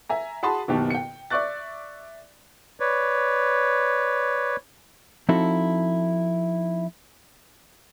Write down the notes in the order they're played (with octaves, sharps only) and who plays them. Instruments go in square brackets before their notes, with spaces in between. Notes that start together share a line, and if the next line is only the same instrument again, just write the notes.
[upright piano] E5 G#5 A#5
F#4 G#4 A5 B5 C6
F#1 B2 D#3 G4 A5
G5 C#7
D5 E5 C#6 D6 F#6 A6
[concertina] B4 C#5 D5
[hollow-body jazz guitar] F3 C4 D#4 E4 F#4 A4